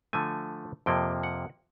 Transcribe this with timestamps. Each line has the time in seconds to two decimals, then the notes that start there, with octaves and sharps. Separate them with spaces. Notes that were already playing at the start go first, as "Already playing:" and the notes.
0.13 D3 F3 A3 G#5
0.86 F2 C3 F3 A#3 G5
1.23 F#5